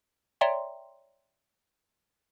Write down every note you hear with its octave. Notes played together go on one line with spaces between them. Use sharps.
C#5 D5 E5 G5 A#5 C6